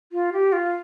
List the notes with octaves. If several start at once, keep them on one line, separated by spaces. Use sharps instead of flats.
F4
G4
F4